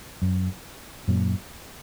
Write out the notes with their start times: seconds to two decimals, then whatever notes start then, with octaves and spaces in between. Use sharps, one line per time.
0.22 F#2
1.08 F#2 A#2